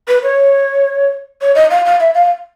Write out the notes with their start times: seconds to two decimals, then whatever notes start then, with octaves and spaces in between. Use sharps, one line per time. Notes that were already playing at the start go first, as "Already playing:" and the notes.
0.08 B4
0.23 C#5
1.41 C#5
1.55 D#5
1.71 F5
1.85 F5
2.00 E5
2.15 F5